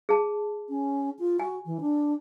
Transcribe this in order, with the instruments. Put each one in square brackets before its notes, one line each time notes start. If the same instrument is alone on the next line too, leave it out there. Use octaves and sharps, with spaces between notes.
[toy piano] G#4 A5
[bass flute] C#4
F4
[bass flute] F#4 [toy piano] G#5
[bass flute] E3
D4